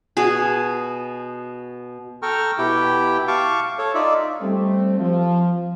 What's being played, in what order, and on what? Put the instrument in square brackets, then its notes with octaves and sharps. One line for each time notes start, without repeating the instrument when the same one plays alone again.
[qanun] B2 G#4
[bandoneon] A4 G5 A#5 C#6 F6
B2 E4 G4 G5
F5 A5 C#6 D6
A4 C#5
D#4 F4 D5 E5
[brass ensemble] G3 A3 C4
F3